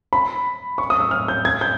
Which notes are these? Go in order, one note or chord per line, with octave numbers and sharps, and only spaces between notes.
B5
C#6
D#6
E6
F6
G6
G#6
G6